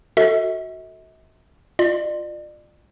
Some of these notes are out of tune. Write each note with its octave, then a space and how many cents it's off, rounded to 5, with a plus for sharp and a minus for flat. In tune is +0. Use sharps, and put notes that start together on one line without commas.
F#4 +0 A4 +25 E5 -45
F4 +0 D5 +40